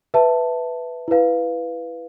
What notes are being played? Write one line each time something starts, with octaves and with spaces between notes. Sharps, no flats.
B4 E5 A5
E4 B4 F5